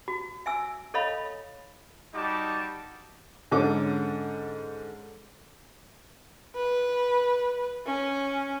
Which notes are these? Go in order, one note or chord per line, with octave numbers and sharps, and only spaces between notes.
F#4
E5 G#5 E6
A4 C#5 D#5 F5 B5
G3 D#4 F#4 A5 D6
G#2 D3 C#4 D6
B4
C#4